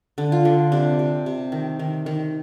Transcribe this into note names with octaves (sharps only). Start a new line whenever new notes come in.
D3
F4
D3
C3 D4
C3
C3
D#3
D#3
D#3